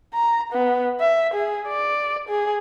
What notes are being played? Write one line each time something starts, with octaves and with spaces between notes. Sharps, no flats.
A#5
B3
E5
G#4
D5
G#4